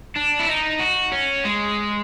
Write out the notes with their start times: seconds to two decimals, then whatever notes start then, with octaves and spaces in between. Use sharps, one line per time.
0.16 D4
0.40 E4
0.49 D#4
0.80 F#4
1.12 C#4
1.45 G#3